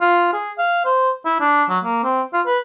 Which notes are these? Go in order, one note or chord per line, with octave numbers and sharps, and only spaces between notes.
F4
G#4
F5
C5
E4
D4
F#3
A#3
C4
F4
B4